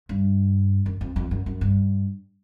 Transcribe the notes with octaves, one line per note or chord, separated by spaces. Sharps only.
G2
F#2
F2
F2
F#2
F#2
G2